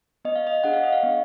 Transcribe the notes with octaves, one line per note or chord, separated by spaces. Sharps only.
B3 D#5
F5
D#5
D4 G#4 F#5
F5
D#5
F5
B3